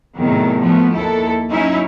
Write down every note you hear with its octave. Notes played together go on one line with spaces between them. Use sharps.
E2 A2 C3 D#3 F#3
F3 A3 B3
D#2 E4 A4
F#3 C#4 D#4 E4